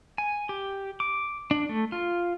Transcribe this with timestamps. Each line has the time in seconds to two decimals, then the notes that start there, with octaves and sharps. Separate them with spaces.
0.18 G#5
0.49 G4
1.00 D6
1.51 D4
1.69 A3
1.92 F4